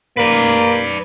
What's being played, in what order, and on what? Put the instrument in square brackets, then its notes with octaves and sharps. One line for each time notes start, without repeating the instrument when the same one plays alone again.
[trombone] A#3 [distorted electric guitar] B4 D5